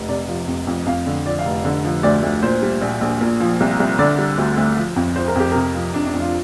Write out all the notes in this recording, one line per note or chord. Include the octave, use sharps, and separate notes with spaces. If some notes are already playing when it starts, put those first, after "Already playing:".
Already playing: F1
C3 D5
F3
F2
F2
F2 F5
D3
F3 D5
F5
F1
D3
F3
D2 D5
D2
A#2 C5
G3
A#1
A#1
A#2
F3
C2
C2
D3 D5
G3
D2
D2
F3
F2
F3 C5
A#4
F2 G4
C3 A#4
F3
F2 D4
D4
F2
F4